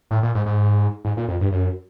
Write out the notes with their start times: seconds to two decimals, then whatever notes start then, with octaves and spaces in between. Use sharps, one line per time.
0.11 A2
0.23 A#2
0.35 G#2
0.46 G#2
1.05 G#2
1.17 A#2
1.29 F2
1.41 G2
1.52 F#2